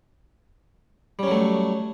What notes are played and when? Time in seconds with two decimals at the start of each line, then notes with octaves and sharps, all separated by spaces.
1.19 G3
1.23 C#4
1.27 F#3
1.31 A3